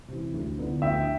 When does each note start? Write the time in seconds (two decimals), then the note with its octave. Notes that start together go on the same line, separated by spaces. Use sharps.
0.08 C3 E3
0.34 D2
0.58 D3 F3 B3 E4
0.82 D2 E5 G5